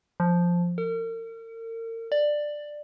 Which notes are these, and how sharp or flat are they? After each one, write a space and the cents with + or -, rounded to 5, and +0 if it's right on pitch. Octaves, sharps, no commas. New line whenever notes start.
F3 +0
A#4 -40
D5 +10